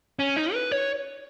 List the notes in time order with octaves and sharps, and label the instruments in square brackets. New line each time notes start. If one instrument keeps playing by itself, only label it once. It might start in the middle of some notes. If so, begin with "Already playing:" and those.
[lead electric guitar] C#4
D#4
B4
C#5